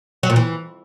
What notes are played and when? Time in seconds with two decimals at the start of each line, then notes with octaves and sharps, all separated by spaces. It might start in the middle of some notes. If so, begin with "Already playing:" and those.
0.23 F#3
0.30 A#2
0.36 E3